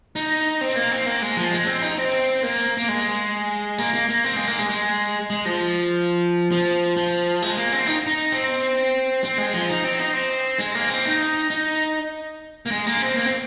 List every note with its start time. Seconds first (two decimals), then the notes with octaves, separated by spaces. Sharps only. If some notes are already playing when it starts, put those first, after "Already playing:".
0.16 D#4
0.61 C4
0.76 A#3
0.92 C4
1.06 A#3
1.22 G#3
1.37 F3
1.52 G#3
1.67 C4
1.82 D#4
1.98 C4
2.43 A#3
2.77 A#3
2.88 G#3
3.78 A#3
3.94 A#3
4.09 A#3
4.24 C4
4.36 G#3
4.48 A#3
4.59 G#3
4.69 G#3
5.30 G#3
5.46 F3
6.52 F3
6.97 F3
7.42 G#3
7.57 A#3
7.72 C4
7.87 D#4
8.06 D#4
8.32 C4
9.24 C4
9.38 G#3
9.54 F3
9.69 D#4
9.84 C4
9.99 D#4
10.14 C4
10.59 G#3
10.75 A#3
10.89 C4
11.05 D#4
11.50 D#4
12.66 A#3
12.71 G#3
12.87 A#3
13.01 C4
13.17 A#3
13.27 C4